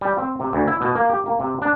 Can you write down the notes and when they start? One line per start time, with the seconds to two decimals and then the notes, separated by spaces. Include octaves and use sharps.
0.01 G3
0.18 C4
0.40 C3
0.53 D2
0.67 E4
0.81 B2
0.95 A#3
1.10 G4
1.26 A#3
1.40 C3
1.62 D4